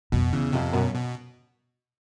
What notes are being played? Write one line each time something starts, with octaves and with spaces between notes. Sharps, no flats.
F2 B2
E2 C#3
F2 C3
F#2 B2
B2